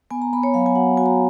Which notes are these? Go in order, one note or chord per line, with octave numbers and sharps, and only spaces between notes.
B3 G#5
A#5
B3 B5
C#5
F#3 F5
G#5
F#4 F#5
F#4 G#5
A#5